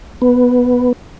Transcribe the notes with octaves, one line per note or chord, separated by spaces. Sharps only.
B3